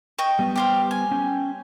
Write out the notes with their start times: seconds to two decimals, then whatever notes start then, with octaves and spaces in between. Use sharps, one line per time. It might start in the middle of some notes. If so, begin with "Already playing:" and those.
0.18 D#5 G5 C#6
0.39 G3 B3
0.56 G4 C5 F5
0.91 G#5
1.12 C#4 G5